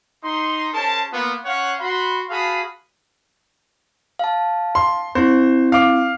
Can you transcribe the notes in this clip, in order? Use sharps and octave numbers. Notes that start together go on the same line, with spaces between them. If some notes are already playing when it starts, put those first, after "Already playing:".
D#4 C6
C#4 G#4 A#4 C5 A5
A#3 B3 F4
C#4 C5 C#5 F5 F#5
F#4 B5 C6
F#4 G#4 F5 A5 B5 D#6
F5 A5
C6
C4 E4 C5
F5 D6